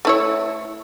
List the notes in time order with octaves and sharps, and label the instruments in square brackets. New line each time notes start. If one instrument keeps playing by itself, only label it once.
[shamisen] A3 E4 C#5